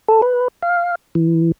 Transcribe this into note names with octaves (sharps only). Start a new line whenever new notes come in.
A4
B4
F5
E3